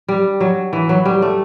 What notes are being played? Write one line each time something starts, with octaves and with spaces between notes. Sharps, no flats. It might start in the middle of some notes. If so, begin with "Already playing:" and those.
G3
F#3
E3
F#3
G3
A3